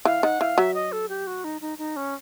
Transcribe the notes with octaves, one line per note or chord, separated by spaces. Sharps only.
E3 F5
D#3 F#5
E3 F5
F#3 E5
D#5
A4
G4
F#4
D#4
D#4
D#4
C#4